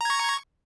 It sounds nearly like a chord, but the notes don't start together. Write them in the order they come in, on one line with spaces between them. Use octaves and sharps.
A#5 G#6 C#6